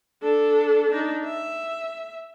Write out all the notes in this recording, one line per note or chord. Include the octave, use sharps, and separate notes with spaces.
D4 A4
D4 D#4
E5